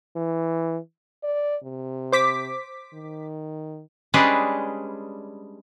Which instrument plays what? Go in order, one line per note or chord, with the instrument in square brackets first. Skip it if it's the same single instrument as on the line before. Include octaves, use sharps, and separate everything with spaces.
[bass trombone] E3
[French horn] D5
C3
[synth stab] C5 D6 B6
[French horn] D#3
[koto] G3 G#3 C#4 D4 G#4 B4